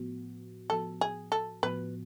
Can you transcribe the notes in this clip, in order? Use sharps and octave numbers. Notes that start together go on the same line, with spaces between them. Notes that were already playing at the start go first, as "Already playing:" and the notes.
Already playing: A2 F3 B3 F#4
A2 F3 B3 F#4 A4
G#4
A4
A2 F3 B3 F#4 B4